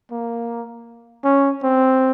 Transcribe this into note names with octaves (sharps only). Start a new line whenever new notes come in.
A#3
C#4
C4